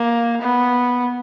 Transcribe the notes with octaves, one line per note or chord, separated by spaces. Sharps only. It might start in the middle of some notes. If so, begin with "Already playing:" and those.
Already playing: A#3
B3